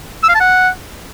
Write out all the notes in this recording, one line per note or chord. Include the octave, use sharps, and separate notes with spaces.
E6
F5
A5
F#5